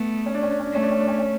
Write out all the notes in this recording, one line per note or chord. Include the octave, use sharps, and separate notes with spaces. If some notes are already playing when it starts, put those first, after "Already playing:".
Already playing: A3 B3
C#4
D4
C#4
D4
C#4
D4
A3 C#4
D4
C#4
D4
C#4
C#4